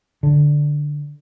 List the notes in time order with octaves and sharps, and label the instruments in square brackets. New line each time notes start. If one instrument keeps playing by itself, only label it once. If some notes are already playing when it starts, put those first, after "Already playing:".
[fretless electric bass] D3